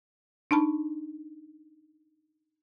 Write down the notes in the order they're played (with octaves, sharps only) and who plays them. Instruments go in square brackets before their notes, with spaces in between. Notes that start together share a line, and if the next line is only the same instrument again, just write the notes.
[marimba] D4 D#4 A5 B5